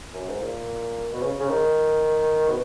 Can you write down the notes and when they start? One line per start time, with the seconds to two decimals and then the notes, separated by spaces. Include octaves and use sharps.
0.14 F#2
0.28 G#2
0.41 A#2
1.12 B2
1.22 C#3
1.40 C#3
1.49 D#3
2.48 B2